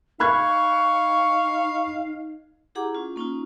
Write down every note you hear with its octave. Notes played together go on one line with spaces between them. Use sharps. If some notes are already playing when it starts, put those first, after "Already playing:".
D#4 F5 B5 C#6 F#6 G#6
E4 G4 G#4 F#5 A#5 D6
C#4 F4
A#3 C#4 D#4 F4